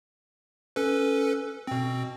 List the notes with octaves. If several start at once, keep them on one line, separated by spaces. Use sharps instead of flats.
C#4 A4 B4
B2 C4